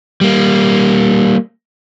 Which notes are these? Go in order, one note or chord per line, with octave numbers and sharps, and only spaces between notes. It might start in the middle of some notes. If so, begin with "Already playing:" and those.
G3 A#3